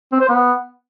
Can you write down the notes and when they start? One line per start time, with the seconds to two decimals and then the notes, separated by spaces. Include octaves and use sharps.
0.12 C4
0.21 C5
0.29 B3